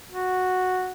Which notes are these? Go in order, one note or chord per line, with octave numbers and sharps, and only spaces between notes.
F#4